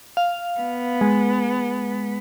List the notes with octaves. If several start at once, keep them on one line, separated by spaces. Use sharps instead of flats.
F5
B3
G#3